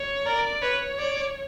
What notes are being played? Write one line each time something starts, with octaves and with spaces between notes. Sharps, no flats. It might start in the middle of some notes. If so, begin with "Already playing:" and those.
Already playing: C#5
A#4 D5
B4 C#5
D5